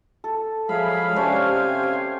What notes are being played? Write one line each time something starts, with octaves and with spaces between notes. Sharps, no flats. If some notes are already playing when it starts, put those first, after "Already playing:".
A4
F3 F#3 G#3 G#4 E5 F5 B5
C3 C#4 D4 G4 C5 E5 G#5
G5